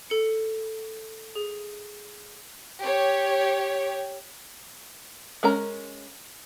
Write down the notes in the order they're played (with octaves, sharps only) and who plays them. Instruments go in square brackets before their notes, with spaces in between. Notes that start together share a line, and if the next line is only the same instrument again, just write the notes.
[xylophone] A4 C#7
G#4
[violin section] G4 C#5
[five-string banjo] G#3 C#4 A#4 A#5